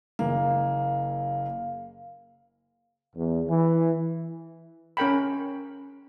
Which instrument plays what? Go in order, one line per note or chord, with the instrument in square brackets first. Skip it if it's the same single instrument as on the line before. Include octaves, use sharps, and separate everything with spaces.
[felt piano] F#1 A#3 [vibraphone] F5
[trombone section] E2
E3
[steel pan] C#4 A#4 G5 B5